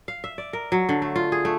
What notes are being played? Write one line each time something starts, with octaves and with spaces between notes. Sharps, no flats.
F5
E5
D5
A#4
F#3
D3
A3
F4
G#4
A3